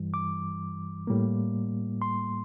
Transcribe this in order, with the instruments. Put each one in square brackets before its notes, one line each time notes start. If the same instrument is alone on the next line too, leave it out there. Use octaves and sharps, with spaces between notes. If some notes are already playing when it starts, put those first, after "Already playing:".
Already playing: [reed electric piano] G2 E3 G3
D6
A2 G3 A#3
C6